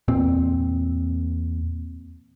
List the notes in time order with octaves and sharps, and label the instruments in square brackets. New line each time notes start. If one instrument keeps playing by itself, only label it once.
[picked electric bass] E2 A#2 C4